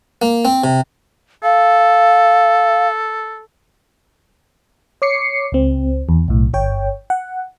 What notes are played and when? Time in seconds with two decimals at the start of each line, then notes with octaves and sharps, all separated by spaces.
0.22 A#3
0.45 C4
0.64 C3
1.44 A4 F5
5.02 C#5 D6 C7 C#7
5.52 C#2 C4
6.09 E2
6.28 B1 A2
6.54 G1 C#5 G5
7.10 F#5